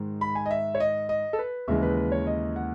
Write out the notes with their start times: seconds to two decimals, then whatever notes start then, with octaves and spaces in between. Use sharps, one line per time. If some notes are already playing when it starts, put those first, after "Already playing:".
Already playing: G#2 D#3 G#3
0.21 B5
0.35 G#5
0.46 D#5
0.51 E5
0.75 C#5
0.80 D#5
1.09 D#5
1.33 A4
1.39 B4
1.68 D#2 C#3 E3 G#3 E5
1.83 B4
1.97 B4
2.12 C#5
2.27 D#5
2.56 F#5